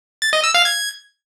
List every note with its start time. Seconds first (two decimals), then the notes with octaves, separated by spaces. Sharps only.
0.22 A6
0.33 D#5
0.44 E6
0.54 F5
0.65 G#6